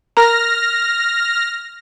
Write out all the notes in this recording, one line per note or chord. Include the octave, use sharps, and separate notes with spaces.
A#4 A#5 F6 A#6